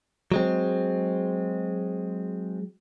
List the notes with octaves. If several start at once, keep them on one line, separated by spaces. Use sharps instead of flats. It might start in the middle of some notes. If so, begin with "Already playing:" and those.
F#3 G#3 C4